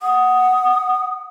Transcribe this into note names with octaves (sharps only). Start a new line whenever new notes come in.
F#5 D#6